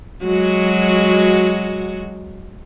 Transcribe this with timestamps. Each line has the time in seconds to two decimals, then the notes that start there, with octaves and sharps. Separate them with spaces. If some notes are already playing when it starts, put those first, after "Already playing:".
0.24 F#3 G#3 F#4